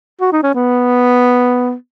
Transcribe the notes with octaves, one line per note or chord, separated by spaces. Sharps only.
F#4
D#4
C#4
B3